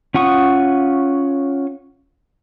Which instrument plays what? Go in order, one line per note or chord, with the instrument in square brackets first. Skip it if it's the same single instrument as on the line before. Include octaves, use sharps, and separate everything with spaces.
[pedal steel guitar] C#4 F4 F#5 C#6 D#6